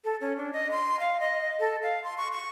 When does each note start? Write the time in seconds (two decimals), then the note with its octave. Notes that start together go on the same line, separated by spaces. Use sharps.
0.05 A4
0.21 C#4
0.37 D4
0.53 D#5
0.71 C6
1.00 F5
1.20 D#5
1.60 A4
1.83 F5
2.04 C6
2.18 C#6
2.32 C#6